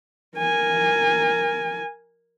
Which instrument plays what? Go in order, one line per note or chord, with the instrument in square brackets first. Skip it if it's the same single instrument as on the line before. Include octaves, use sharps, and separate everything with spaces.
[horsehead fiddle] A#4 G#5